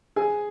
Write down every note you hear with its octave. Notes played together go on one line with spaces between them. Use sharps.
G#4 G#5